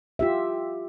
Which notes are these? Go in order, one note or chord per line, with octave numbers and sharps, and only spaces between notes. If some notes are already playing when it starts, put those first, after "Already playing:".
F4 G4 E5